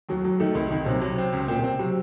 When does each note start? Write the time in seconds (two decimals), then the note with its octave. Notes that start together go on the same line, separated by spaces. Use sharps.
0.09 D#2 F#3
0.24 D#2 F#3
0.40 D#3 A3
0.55 C2 D#3
0.71 C2 D#3
0.86 C3 F#3
1.02 F#3
1.18 C4
1.33 C#2
1.48 A#2 C4
1.59 C3
1.64 C4
1.79 C3 F#3